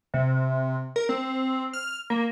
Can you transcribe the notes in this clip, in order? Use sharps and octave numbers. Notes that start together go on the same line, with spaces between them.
C3
A#4
C4
F6
A#3